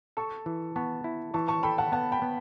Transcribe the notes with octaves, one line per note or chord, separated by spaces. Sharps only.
A4 A5 C#6
E3
B3 A5 C#6
E4
E3 A5 C#6
A5 C#6
A4 G5 B5
F#5 A5
B3 F#5 A5
G5 B5
B3